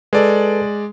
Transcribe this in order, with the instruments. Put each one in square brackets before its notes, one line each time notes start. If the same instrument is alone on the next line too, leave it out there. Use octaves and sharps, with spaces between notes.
[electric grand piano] G#3 D5 [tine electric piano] A4 B4